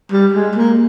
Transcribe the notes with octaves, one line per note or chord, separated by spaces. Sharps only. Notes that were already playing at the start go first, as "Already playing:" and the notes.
G3
G#3
A#3